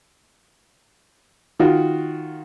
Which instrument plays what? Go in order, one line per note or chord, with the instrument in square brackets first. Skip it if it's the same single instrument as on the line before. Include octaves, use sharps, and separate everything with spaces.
[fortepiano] D#3 F4 F#4